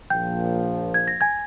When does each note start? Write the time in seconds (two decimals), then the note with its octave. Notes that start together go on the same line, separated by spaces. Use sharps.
0.10 A#1 A#2 F3 G5 G6
0.94 G#6
1.08 A#6
1.21 G#5 G#6